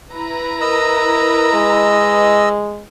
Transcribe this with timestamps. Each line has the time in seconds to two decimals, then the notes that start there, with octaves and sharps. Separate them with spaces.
0.12 E4 B4 A#5
0.61 A#4 D#5 E6
1.53 G#3